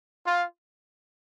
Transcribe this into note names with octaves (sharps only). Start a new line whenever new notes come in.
F4